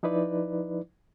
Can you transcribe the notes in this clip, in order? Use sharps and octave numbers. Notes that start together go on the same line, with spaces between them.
F3 D#4 E4 B4 D5